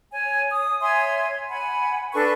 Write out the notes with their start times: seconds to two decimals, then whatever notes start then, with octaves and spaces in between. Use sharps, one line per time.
0.12 C#5 G#5
0.50 D#6
0.80 C#5 E5 G#5 C6
1.49 F#5 G#5 B5
2.13 D4 A4 B4 C#6